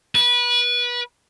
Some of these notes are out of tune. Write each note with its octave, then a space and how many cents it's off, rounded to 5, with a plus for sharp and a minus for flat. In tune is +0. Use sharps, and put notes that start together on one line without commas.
B4 -25